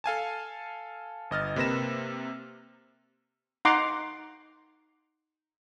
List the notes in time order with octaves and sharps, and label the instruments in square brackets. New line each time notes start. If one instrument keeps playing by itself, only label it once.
[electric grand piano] A4 F5 G#5 A5
G1 D#5 F6 A6
C3 A#3 B4 A#6 E7
[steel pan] D#4 F#5 A#5 C6 D6